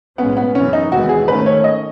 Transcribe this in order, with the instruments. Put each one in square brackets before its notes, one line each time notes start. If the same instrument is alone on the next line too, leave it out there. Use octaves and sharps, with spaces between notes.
[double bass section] B1 A2 G#3 C#4 [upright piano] B3
[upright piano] B3
[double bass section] F#2 C#3 E3 B3 [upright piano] C#4
[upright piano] D#4
[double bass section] D#2 C#3 E3 G#3 B3 [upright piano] F#4
[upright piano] G#4
[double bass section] G#2 D#3 A3 C#4 [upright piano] B4
[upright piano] C#5
D#5